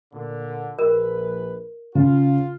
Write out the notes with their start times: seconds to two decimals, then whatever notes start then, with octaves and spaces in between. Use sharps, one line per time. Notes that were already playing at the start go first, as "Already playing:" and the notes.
0.13 A#2 D3
0.79 A#1 A#4 B4
1.95 C#3 F4